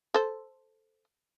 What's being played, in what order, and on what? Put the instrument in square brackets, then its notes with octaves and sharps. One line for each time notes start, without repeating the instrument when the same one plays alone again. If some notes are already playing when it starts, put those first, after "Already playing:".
[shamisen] A4 C5